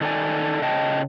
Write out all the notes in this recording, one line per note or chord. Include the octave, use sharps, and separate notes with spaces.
D#3 A4 C#5 D5 G#5
C#3 D#5 G5 A5